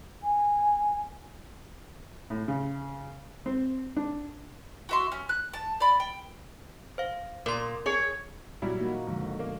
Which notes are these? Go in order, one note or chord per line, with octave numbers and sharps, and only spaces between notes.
G#5
A2
C#3
C4
D4
F#4 E5 C6
C#4
F#6
A5
D5 B5
G5
C5 F5
A#2 A#4 C6
G#4 C#5
A#2 F#3 G3 E4
A#3 D#4 F#4
F#1 D3 F3 G#3
A#3